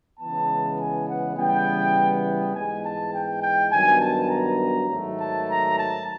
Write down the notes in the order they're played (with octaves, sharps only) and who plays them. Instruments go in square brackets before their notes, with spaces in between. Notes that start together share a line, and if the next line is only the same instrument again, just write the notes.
[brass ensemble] C#3 E3 G#3 B3 A5
G#5
F#5
C#3 E3 G3 B3 G5
G5
G#2 E3 G#3 B3 G#5
A5
G5
G5
G2 D#3 F#3 B3 G#5
A5
A#5
G#2 D#3 F#3 A3
A5
A#5
A5